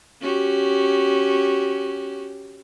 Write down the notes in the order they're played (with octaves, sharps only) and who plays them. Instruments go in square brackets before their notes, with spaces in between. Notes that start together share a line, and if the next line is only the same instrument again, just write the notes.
[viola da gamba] C#4 F#4 G4